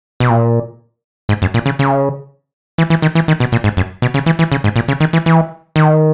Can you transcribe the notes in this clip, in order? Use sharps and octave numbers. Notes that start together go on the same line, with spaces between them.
B2
A#2
G#2
F#2
A#2
C#3
C#3
E3
E3
D#3
E3
D#3
B2
A#2
G#2
F#2
B2
C#3
E3
E3
C#3
G#2
A#2
C#3
D#3
E3
E3
D#3